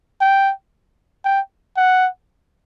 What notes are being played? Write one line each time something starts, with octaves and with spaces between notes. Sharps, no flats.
G5
G5
F#5